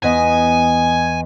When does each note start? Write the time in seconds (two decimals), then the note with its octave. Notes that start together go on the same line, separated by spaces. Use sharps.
0.03 E2 B3 D#5 G#5